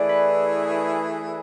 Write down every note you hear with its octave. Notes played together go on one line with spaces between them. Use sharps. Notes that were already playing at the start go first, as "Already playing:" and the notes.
Already playing: E3 A3 E4 G#4 D5
B4